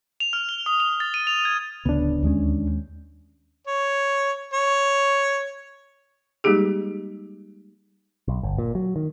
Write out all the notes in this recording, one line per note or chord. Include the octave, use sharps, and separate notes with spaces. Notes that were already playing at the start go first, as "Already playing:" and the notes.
F7
F6
G7
D#6
F7
A6
D#7
F7
G#6
D1 D2 C#3 B3 D4
D#2 G#3 C#4
C#5
C#5
G3 G#3 A#3 D#4 G4 G#4
B1
G1
A#2
F#3
D#3